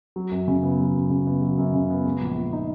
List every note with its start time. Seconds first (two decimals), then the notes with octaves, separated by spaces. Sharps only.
0.16 F#3
0.31 F#2
0.48 C#3
0.63 B3
0.79 F#3
0.94 F#2
1.10 C#3
1.27 B3
1.42 F#3
1.58 F#2
1.74 C#3
1.90 B3
2.05 G#3
2.21 A#1
2.37 A#2
2.53 D#4